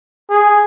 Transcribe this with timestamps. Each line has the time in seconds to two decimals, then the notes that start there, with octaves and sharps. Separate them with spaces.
0.30 G#4